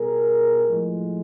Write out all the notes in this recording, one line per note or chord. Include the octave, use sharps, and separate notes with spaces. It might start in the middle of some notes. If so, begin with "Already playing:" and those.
Already playing: B2 G3 G#4 A#4
A2 F3 G#3